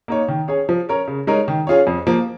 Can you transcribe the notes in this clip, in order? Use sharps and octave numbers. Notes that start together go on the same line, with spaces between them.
A#3 D#4 C#5
D#3
C#4 G#4 C#5
F3
C#4 A#4 C#5
C#3
G#3 D#4 A#4 C#5
D#3
C#4 F4 G#4 C#5
F2
F3 A#3